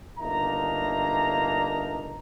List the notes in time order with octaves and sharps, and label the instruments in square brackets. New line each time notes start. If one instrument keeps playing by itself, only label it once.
[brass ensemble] G1 A#3 D4 D#4 E5 A#5